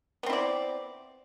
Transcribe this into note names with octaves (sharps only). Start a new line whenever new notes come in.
B3 C4 E4 D5